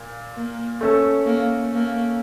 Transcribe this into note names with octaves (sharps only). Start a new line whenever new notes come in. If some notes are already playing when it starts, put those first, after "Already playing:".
Already playing: A#2
A#3
A3 C#4 A4
A#3
A#3